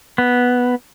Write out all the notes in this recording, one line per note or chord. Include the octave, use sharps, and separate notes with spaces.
B3